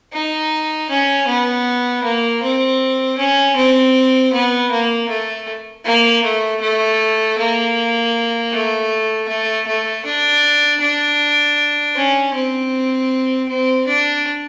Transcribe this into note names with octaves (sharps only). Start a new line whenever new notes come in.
D#4
C#4
B3
A#3
C4
C#4
C4
B3
A#3
A3
A#3
A3
A3
A#3
A3
A3
A3
D4
D4
C#4
C4
C4
D4